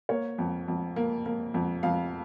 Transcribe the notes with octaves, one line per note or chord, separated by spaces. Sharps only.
A#3 C#5
F2
F2
A#3
A#3
F2
F2 F5